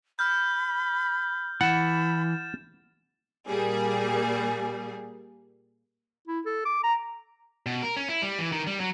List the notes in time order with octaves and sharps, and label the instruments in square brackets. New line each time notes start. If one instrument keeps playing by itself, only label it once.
[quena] B5 [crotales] F6 G6
[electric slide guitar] E3 [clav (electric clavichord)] F#5 [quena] B5 [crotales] A6 E7
[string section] A#2 G3 A#3 G#4
[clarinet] E4
A4
D6
A#5
[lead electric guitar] B2
A#4
C#4
E4
G3
E3
D#3
G3
F#3